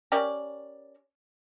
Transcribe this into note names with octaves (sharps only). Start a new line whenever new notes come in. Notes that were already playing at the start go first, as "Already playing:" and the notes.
C#4 G4 A#4 D5